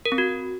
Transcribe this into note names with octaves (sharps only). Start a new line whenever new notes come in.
A#4
C4
F#4